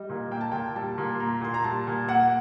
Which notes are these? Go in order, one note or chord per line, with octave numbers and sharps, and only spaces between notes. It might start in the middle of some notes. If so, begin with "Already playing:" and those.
Already playing: G3 D#5
A#2
A#3 G5
A5
A#2 G5
G3 A5
A#2
C6
A#3 A#5
A#2 C6
A#5
G3 A5
A#2
A#3 F#5